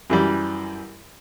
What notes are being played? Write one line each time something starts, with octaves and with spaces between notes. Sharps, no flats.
F#2 E3 G3